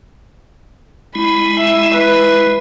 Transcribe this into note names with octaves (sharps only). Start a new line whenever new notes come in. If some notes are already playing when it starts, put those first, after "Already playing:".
G#3 E4 B5
E5
B4